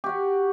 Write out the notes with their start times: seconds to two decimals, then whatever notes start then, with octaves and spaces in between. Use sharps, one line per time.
0.04 G4
0.06 F#4
0.09 F#5